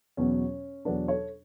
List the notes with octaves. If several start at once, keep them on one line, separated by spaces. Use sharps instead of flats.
E2 B2 F#3 C#4
E2 B2 F#3 B3 D4
A4 C#5